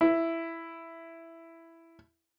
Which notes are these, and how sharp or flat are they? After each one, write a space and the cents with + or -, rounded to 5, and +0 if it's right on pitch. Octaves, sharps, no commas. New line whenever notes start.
E4 +5